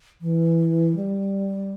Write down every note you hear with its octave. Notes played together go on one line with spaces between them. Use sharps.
E3
G3